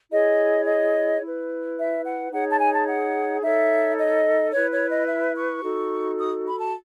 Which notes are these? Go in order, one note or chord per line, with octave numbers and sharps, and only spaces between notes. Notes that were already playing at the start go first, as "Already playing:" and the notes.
E4 G#4 C#5 D#5
D#5
E4 B4
E5
F#5
D#4 G#4 C#5 F#5
A5
G#5
A5
F#5
D#4 A4 C#5 E5
D#5
E4 B4 C#5
C#5
D#5
E5
C#6
D#4 F#4 A4
D#6
B5
A5